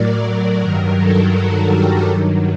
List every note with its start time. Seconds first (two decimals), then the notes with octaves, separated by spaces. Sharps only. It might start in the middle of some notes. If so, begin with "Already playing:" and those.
Already playing: A2 F#3 A#4 D5
0.25 D5
0.61 G2 D#3 F#3 A#4
0.99 A4
1.36 F#4
1.72 G4
2.08 G2 D#3 F#3